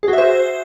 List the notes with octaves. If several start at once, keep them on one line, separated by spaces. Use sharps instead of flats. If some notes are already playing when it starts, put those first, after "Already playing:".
G#4
F#4
E5
C5